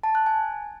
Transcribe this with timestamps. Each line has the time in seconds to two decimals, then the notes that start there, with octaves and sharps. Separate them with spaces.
0.03 A5
0.15 F#6
0.26 G#5